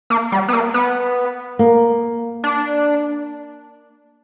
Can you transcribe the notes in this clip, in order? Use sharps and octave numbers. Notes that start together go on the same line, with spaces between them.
A#3
G3
B3
A#3
B3
A#3
D4